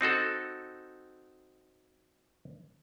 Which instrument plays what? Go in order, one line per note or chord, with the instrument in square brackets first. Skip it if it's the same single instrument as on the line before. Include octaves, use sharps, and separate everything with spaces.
[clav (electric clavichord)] C4 D#4 F#4 A4